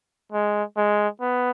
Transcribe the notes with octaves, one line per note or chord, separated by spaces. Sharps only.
G#3
G#3
B3